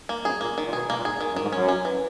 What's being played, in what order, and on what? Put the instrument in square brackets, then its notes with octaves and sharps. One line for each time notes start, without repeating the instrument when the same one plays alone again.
[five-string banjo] A#3
[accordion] F#2 [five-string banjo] G#4
[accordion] A#2 [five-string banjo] A#3
[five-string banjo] D#3
[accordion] A#2
[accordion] B2 [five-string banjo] G#4
[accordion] B2 [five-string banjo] A#3
[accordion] A#2
[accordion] G#2 [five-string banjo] G#4
[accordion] E2
[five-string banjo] D#3
[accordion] F#2
[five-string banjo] D#3
[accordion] G#2
[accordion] F#2 [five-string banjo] C#4
[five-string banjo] C#4
E3